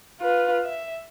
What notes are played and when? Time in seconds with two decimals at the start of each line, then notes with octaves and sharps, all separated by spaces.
0.21 F4 B4
0.64 E5